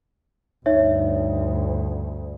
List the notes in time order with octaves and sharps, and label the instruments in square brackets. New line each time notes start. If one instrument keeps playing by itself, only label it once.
[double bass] D2 G2 [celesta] D#4 C#5 E5